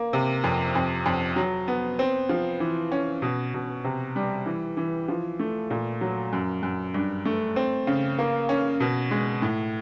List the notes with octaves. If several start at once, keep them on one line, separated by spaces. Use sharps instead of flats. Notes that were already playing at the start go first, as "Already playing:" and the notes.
Already playing: A#3
C3
F2
F2
F2
F#3
B3
C4
F3
E3
C#4
B2
B2
C3
G3
E3
E3
F3
A3
A#2
F#3
F#2
F#2
G2
A3
C4
C#3
A#3
C#4
B2
G#3
A2